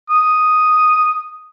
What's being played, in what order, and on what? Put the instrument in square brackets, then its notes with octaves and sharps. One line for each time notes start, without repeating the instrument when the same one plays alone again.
[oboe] D#6